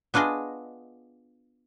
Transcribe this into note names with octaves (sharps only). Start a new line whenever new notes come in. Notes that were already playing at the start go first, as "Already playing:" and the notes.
B3 D4 F4 G#4 D#5